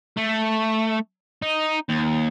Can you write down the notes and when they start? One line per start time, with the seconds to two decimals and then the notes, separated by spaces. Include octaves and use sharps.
0.17 A3
1.42 D#4
1.89 D#2